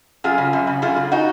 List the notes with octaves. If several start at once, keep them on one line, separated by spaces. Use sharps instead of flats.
F#2 F4 G#4
C#3
F#2
C#3
F#2 F4 G#4
C#3
D#4 F#4